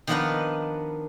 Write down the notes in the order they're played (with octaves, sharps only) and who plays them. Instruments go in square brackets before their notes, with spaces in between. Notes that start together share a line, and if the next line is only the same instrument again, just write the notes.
[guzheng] D#3 F3 B3 D4 A#4 B4